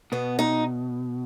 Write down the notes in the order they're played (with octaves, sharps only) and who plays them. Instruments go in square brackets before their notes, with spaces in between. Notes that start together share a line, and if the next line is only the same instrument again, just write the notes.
[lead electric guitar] B2 [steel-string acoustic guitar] B3
[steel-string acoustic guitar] D#4